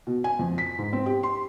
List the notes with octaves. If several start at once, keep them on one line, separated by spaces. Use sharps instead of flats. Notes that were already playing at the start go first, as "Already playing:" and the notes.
B2
G#5
F2
B6
G#2
C4
G4
C6